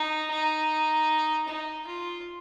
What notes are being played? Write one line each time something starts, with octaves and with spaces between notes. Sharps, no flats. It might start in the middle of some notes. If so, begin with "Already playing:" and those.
Already playing: D#4
D#4
D#4
F4